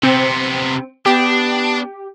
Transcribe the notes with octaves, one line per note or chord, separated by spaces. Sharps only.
C3 B3 C4
B3 D4 G4